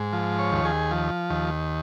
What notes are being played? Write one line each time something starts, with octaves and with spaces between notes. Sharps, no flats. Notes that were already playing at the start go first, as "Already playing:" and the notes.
Already playing: G#2
F3
C#5
D#2
G#4
F3
D#2